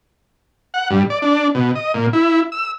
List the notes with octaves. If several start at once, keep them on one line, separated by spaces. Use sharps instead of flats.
F#5
G2
D5
D4
B2
D#5
A#2
E4
E6